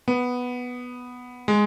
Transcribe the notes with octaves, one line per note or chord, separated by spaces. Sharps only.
B3
G#3